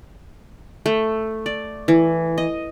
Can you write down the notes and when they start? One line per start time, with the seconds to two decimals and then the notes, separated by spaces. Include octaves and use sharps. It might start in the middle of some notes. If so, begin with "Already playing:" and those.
0.86 A3
1.46 D5
1.88 E3
2.38 D#5